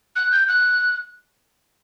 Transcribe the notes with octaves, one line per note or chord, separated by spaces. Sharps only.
F#6
G6
F#6